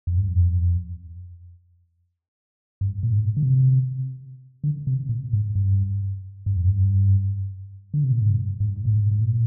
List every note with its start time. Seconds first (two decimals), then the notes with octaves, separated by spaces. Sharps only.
0.07 F2
0.17 G2
0.28 F2
2.81 G2
3.03 A#2
3.12 G#2
3.37 D3
3.43 C3
4.64 D3
4.87 C3
5.09 A#2
5.33 G#2
5.55 G2
6.46 G2
6.57 F2
6.68 G2
7.94 D3
8.04 C3
8.11 A#2
8.21 G#2
8.30 G2
8.60 G#2
8.68 G2
8.76 G#2
8.85 A#2
8.91 G#2
9.11 G#2
9.21 A#2